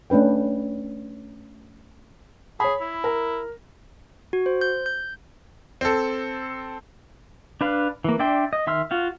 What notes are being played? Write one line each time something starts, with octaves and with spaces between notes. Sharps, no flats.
A3 C#4 D4 B4 G5
G#4 C#5 B5
E4
A#4
F#4
C5
G6
G6
C4 A4
D4 B4 F5
E3 A#3
D4 D5 E5 G5 C6
D#5
D#3 E5 C6 E6 F6
F4 F#4 F5